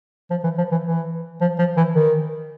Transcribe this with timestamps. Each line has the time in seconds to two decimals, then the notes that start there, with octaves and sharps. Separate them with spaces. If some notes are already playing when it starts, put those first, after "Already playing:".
0.31 F3
0.44 E3
0.58 F3
0.71 E3
0.85 E3
1.41 F3
1.58 F3
1.77 E3
1.95 D#3